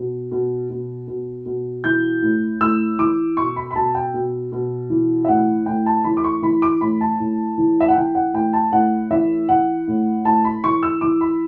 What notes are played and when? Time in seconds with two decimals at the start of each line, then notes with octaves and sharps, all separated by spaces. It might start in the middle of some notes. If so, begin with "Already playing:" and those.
Already playing: B2
0.32 B2
0.70 B2
1.07 B2
1.46 B2
1.84 E3 G6
2.22 A2
2.61 A2 E6
2.99 E3 D6
3.37 B2 C#6
3.56 B5
3.71 B5
3.75 B2 A5
3.95 G5
4.14 B2
4.52 B2
4.90 E3
5.25 E5
5.28 A2 F#5
5.66 A2 G5
5.86 A5
6.04 E3 B5
6.17 D6
6.24 C#6
6.42 E3 B5
6.62 D6
6.81 A2 B5
7.01 A5
7.20 A2
7.58 E3
7.80 E5
7.88 F#5
7.96 E3 G5
8.15 F#5
8.34 A2 G5
8.53 A5
8.72 A2 F#5
9.10 E3 E5
9.49 E3 F#5
9.87 A2
10.25 A2 A5
10.44 B5
10.64 E3 C#6
10.83 E6
11.01 E3 D6
11.21 B5